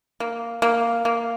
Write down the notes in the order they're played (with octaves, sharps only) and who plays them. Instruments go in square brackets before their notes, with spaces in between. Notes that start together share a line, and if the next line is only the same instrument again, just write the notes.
[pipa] A#3
A#3
A#3